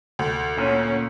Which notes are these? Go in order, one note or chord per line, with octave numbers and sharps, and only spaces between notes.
D2
A#2 C#4